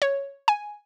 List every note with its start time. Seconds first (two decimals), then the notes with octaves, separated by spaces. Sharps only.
0.02 C#5
0.48 G#5